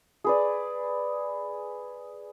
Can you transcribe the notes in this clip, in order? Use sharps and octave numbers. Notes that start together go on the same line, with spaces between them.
G#4 B4 D5